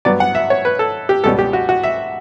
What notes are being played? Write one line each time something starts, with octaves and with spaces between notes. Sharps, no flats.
G2 F#3 B3 D5
F#5
E5
C#5
B4
A4
G4
C#2 B2 G3 C#4 A4
G4
F#4
F#4
E5